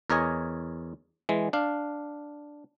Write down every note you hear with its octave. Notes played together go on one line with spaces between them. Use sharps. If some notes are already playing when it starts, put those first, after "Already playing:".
E2 A#4 C#5 D#5 G#5
E3 G#3
D4 F5